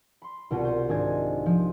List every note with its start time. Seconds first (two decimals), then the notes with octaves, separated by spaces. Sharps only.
0.22 B5 C6
0.51 C2 B2 F4 F#4 A#4 D#7
0.65 C5
0.89 G#1 D4 G#4 D#5 G#5 G#6
1.46 F3